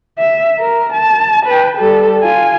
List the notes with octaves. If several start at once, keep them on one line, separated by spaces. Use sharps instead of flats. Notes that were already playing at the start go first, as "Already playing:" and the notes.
E5
A#4
A5
B4 G5
G3 A4
F4 G#5